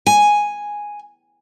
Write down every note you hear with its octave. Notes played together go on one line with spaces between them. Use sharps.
G#5